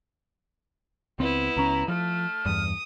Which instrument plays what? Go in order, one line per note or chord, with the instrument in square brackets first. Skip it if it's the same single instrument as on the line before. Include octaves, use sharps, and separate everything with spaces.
[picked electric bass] C#2 C4 [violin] B3 E4
[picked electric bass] C#2 C#4 [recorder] A#5
[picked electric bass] F3 [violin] A3 [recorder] F6
[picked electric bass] E2 G2 [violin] D#6